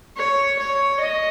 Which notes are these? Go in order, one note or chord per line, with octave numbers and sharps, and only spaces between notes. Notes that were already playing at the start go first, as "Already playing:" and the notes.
C#5
C#5
D#5